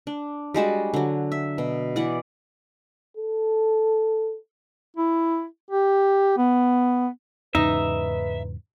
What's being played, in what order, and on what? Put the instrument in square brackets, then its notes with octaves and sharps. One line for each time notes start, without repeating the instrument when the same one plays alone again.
[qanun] D4
G3 G#3 F#4 A5
D3 F#3
E5
B2
E3 D5 F#5
[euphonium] A4
[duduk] E4
G4
B3
[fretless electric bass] E2 G#2 C#3 [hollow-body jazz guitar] D#4 [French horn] B4 [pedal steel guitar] E5